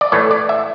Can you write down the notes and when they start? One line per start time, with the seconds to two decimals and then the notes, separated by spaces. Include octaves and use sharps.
0.01 D5
0.12 A2 E3 A3 C#5
0.31 D5
0.49 E5